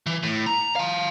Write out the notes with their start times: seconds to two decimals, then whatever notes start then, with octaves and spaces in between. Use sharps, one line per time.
0.06 E3
0.23 A2
0.47 A#5
0.76 F5 A5